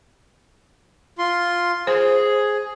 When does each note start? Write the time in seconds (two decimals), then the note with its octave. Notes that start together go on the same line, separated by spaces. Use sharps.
1.18 F4 C6
1.87 G#4 C5